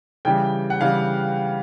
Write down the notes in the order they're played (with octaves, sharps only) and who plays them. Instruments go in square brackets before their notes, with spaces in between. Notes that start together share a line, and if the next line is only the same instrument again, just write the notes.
[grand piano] C#3 E3 G3 G5
F#5
C#3 E3 G3 F5